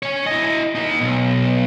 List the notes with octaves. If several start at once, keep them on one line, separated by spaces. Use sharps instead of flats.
C#5 G#5
E4 D#5
A#3 D#4
B1